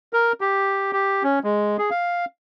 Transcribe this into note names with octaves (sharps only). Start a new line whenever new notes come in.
A#4
G4
G4
C#4
G#3
G#4
F5